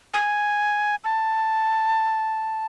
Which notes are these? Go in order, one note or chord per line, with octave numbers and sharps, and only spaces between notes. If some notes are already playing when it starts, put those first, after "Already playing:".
G#5
A5